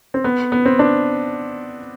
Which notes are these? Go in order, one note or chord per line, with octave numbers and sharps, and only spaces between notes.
C4
B3
B3
C4
D4